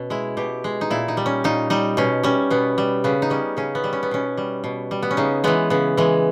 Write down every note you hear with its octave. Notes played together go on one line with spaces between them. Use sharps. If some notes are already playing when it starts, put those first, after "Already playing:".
Already playing: B2 C#4
G#3 E4
B2 G4
G#3
D#4
A#2 E4
D#4
G3
C#4
A#2 D#4
G3 D#4
B2 C#4
G3 C#4
B2 B3
G3
C#3 B3
D#4
G3 C#4
C#3 C#4
B3
G3
C#4
B3
B2 C#4
G3
B2
G3
B3
C#4
C#3 D#4
E3 G#3 B3
C#3 B3
E3 G#3